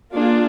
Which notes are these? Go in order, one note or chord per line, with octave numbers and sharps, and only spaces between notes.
A#3 D4 F4 G#4